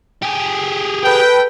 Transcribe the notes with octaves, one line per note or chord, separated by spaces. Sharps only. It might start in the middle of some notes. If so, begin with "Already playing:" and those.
G4 G#4
A4 B4 G5